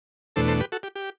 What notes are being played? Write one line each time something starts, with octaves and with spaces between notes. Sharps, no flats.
E2 B2 A3 D4 A4 C5
A4 C5
G4 B4
F#4 A4
G4
G4